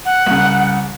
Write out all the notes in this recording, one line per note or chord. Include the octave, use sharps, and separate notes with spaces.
F#5
C2 C#3